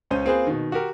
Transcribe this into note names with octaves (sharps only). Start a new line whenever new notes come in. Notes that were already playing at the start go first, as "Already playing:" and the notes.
C#2 C#4 C5 D#7
A#3 C4 F4 G#4 B4 C5
B2 D#3
F#4 G4 A#4